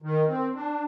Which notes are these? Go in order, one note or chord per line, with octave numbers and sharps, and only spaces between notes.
D#3
C4
D4